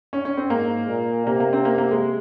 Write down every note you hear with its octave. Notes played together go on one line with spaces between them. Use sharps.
C#4
C#4
C4
G#2 A#3
A#2
C3 A#3
A#3
C4
A#3
A#3
G#3